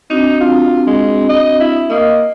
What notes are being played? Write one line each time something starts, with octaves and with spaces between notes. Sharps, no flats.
C4 D4 D#4 F#4
F4
G#3
D#5
E4
A#3 D#5 D#6